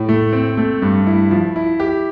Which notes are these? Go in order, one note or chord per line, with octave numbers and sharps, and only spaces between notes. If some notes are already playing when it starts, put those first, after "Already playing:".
Already playing: A2
A3
C4
A3
G2
E4
F3
E4
G4